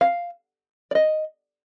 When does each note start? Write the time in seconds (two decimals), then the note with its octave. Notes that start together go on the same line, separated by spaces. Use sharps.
0.01 F5
0.91 D5
0.95 D#5